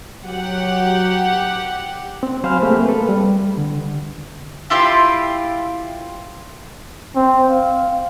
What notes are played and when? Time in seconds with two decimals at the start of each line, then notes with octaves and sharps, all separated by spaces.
0.24 F#3 G4 F#5
2.23 C4
2.43 F#3 C5 F5 G#5 B5 F6
2.62 A3 A#3 C4 G4 G#4
2.85 A4 B4
3.09 G3
3.57 D3
4.70 E4 F4 G4 C6
7.16 C4
7.49 F5